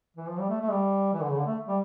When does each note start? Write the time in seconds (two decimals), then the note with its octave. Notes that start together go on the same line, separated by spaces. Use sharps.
0.17 E3
0.28 F3
0.39 G3
0.49 A3
0.60 A3
0.71 G3
1.13 E3
1.21 D3
1.30 C#3
1.38 D3
1.46 A3
1.68 G3